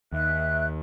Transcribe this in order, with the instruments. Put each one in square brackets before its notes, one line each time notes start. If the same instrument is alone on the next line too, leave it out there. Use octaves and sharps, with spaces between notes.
[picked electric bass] D#2 [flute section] E5 F#6